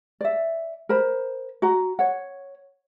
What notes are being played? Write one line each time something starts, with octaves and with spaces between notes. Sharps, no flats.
D5 E5
A#4 C5 B5
F#4 A#5
C#5 F#5